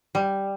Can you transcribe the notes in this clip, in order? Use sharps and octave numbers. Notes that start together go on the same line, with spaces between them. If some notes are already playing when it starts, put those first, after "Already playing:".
G3